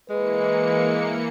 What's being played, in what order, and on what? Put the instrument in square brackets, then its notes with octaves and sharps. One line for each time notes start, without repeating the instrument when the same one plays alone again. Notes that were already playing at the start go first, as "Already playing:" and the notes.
[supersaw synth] E3 A#3 C#7 [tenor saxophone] G#3 [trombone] B4